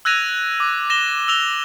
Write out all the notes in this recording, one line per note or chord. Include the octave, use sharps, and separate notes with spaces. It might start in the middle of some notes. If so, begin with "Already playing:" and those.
E6 F#6 G#6 A#6 D#7 F7
D6
A#6 E7 G7
E6 F7 G7